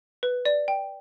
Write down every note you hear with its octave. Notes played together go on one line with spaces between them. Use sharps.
B4
D5
G5